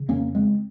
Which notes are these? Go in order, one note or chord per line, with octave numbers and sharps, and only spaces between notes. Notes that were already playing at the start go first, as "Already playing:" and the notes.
Already playing: C#3
F2 A#3 C#4
G#3 C4